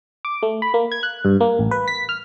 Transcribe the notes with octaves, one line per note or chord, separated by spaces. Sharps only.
D6
A3
B5
A#3
G#6
F#6
G2
A#3
A1
B4
B6
F6